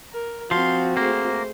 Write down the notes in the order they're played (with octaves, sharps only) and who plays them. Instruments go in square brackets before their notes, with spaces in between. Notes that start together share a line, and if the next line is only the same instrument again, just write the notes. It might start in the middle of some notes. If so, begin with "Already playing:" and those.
[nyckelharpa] A#4
[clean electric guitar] F3 [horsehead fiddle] C4 F#4 [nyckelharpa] F5 [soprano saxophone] C6
[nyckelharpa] A3 G#4 [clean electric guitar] A#3 [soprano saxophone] C5